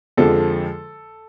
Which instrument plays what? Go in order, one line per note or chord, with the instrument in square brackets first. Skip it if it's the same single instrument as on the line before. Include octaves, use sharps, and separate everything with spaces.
[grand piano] F2 D3 F3 G#3 A4